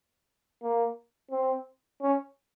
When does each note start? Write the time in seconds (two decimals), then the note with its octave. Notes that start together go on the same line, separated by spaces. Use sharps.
0.63 A#3
1.31 C4
2.01 C#4